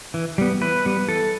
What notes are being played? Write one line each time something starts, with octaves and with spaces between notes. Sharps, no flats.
E3
G3 B3
E3 B4
G3 B3
E3 A4